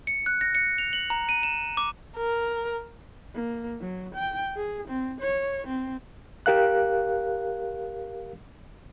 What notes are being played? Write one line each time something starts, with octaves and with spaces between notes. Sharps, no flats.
C#7
F#6
A#6
C#7
F7
F#7
A#5
D#7
E7
D6
A#4
A#3
F#3
G5
G#4
C4
C#5
C4
G4 A#4 F5 F#6